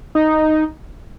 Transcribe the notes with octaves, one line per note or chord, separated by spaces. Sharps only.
D#4